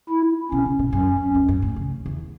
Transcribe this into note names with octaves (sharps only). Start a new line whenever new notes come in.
E4
B2 C#4
C#3
B2
F#2 C#4
E2
F#2
A2
C#3
E2